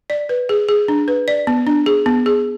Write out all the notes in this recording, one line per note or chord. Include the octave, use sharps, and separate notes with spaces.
D5
B4
G#4
G#4
D4
B4
D5
B3
D4
G#4
B3
G#4